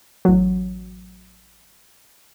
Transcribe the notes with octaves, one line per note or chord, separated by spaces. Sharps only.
A1 F#3